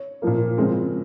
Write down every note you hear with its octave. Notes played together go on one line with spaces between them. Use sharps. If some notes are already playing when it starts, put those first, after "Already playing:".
Already playing: C#5
A#2 F3 A#3
C#3 F3 G#3 C4